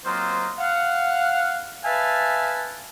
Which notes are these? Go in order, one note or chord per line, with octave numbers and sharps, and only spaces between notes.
F#3 A#3 C4 F4 C5 D#5
F5 F#5
B4 E5 F5 G#5 A5